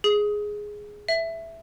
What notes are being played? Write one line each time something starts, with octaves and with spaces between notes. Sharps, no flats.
G#4
E5